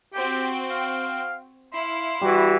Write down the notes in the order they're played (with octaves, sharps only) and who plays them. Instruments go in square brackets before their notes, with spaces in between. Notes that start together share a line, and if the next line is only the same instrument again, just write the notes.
[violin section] C4 F#4 G5 [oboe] G4
[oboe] F5
[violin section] E4 F5 [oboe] C6
[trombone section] E3 F#4 [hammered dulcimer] G3